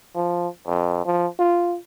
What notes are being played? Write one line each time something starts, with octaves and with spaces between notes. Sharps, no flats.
F3
F2
F3
F4